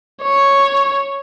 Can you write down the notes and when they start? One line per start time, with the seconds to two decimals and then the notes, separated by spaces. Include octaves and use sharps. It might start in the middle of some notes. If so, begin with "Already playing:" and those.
0.22 C#5